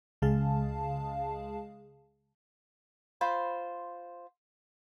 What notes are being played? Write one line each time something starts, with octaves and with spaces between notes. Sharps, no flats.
C#2 C#3 G#3 G#4 F5 A5
F4 C5 B5